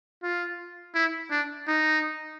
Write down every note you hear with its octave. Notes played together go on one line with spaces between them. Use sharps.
F4
E4
D4
D#4